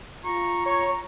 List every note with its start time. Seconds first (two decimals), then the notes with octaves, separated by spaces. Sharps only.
0.25 F4 A#5 C#6
0.66 C#5 C#6